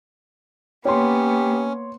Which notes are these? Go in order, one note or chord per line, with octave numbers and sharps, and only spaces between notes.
A#3 B3 C#4 G4 C#5 C6